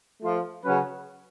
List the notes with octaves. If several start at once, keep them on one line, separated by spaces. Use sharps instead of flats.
F3 A3 F4
C#3 F#3 C#4 F#4 B4